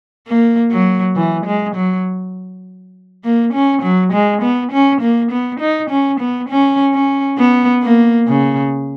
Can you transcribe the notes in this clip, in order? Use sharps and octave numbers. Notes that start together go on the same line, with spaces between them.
A#3
F#3
E3
G#3
F#3
A#3
C#4
F#3
G#3
B3
C#4
A#3
B3
D#4
C#4
B3
C#4
C#4
B3
A#3
C#3